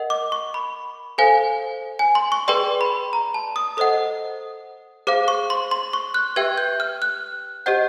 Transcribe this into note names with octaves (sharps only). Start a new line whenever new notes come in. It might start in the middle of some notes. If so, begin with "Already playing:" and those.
Already playing: A#4 D#5 F#5
D6
C#6
B5
A4 C5 F5 G#5
G#5
C6
C#6
G#4 B4 D5 G5 C6
B5
A#5
A5
D#6
A4 C5 D#5 F#5 D#6
G#4 C5 F5 D6
C#6
C6
C6
C#6
F#6
G4 B4 E5 G5 G#6
G6
F6
F#6
G4 C5 D#5 F#5 G6